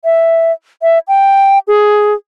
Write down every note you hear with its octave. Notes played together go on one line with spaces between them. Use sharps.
E5
E5
G5
G#4